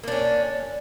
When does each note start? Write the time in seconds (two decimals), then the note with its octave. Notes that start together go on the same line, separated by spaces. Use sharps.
0.03 A#3
0.08 D4
0.12 C#4